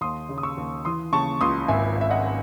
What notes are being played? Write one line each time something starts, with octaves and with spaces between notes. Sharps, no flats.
D#2 C6 D#6
C#3
D#6
C#6 E6
D#2
E3 C6 D#6
C#3 A5 C#6
C#2 C6 D#6
G#1 E5 G#5
G#1 E5
D#5 F#5